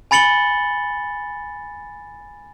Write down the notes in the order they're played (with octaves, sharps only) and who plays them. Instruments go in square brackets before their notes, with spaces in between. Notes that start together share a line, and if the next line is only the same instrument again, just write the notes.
[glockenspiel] G#5 B5 A6 C#7 F#7 G7